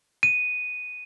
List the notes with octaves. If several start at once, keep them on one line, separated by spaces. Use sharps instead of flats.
D#7